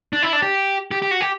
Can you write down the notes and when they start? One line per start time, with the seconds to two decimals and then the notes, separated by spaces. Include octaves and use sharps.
0.13 D4
0.23 E4
0.33 D4
0.42 G4
0.91 G4
1.02 G4
1.11 F#4
1.21 G4